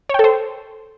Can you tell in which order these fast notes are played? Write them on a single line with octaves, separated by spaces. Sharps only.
C#5 G5 A4 C5